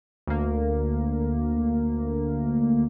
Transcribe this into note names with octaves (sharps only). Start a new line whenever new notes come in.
D2 A#3